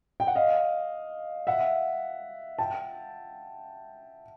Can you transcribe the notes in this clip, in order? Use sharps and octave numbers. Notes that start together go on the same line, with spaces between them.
G5
F#5
D#5 F5
E5 F#5
G5 A5